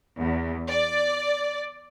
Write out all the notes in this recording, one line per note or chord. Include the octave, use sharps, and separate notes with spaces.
E2
D5